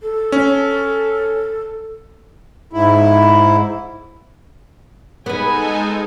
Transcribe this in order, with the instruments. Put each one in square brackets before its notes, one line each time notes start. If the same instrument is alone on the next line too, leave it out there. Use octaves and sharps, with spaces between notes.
[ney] A4
[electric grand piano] C#4
[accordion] G#2 E4
[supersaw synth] G#3 D#4 A4 [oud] B3 B4 [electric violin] G#4 G#5